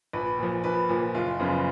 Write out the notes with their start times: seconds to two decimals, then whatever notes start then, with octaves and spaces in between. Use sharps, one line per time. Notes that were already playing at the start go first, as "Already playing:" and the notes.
0.13 A#1 B4
0.39 A#2 F3
0.64 A#1 B4
0.89 A#2 F3
1.15 F#1 F4
1.39 F#2 C#3 F3 B3